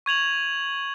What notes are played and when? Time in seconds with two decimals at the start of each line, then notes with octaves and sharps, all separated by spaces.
0.06 C#6 G#6 F7 F#7